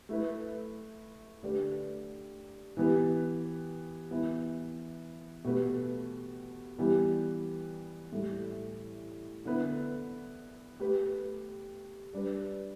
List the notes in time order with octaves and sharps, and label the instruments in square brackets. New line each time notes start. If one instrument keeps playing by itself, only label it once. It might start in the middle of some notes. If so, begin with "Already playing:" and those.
[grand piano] A3 E4 B4
D3 A3 D4 G4 B4
E3 B3 G4
E3 B3 E4
B2 A3 G4 B4
E3 G3 B3 G4
A2 G3 E4 A4
D3 B3 E4 B4
A3 G4 B4
G3 D4 B4